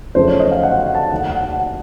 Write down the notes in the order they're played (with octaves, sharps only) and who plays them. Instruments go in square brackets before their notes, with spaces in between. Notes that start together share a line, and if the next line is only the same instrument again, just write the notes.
[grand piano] F#2 C#3 F3 A3 C5
C#5
D#5
F5
F#5
F#5
A5
D#2 D#3 A3 F#5
F#5
F#5
F#5